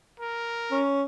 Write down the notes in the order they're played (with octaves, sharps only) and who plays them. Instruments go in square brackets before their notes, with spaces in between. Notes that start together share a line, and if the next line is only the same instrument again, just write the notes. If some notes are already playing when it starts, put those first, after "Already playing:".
[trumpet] A#4
[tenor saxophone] C#4